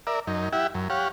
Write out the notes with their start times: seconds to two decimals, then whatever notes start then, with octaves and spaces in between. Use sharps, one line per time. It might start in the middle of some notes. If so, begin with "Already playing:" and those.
0.07 A#4 D5 E5
0.27 F#2 D#4
0.53 E4 G4 E5 F#5
0.74 F#2
0.90 G4 C#5 F5 F#5